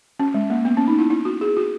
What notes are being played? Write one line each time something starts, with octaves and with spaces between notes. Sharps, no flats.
C#4
G#3
A#3
B3
C#4
D#4
E4
E4
F#4
G#4
F#4